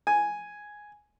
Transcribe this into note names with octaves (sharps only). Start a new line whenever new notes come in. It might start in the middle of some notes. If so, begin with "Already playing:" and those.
G#5